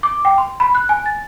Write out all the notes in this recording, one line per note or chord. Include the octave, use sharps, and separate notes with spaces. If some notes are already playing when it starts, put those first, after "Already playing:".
D6
G5
C6
B5
F#6
G#5
A6